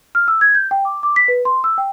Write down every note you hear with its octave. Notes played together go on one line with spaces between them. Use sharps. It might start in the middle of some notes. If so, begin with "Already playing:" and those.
F6
E6
G#6
G6
G5
D6
D6
B6
B4
C6
E6
G5